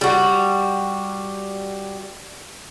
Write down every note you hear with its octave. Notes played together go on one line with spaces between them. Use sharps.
G3 F#4